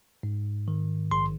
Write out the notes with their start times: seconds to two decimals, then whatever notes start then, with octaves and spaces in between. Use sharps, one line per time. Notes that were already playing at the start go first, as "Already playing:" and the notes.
0.23 G#2
0.68 D#3
1.11 A#1 C6